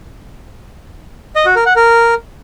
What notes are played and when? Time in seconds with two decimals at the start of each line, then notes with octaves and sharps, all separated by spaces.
1.36 D#5
1.46 F#4
1.56 A#4
1.66 F#5
1.76 A#4